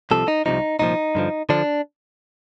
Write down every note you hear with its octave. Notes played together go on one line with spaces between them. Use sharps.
C2 C3 F3 A4
D#4
C2 C3 F3 D#4
C2 A#2 F3 D#4
G2 D3 F3
D3 F3 D4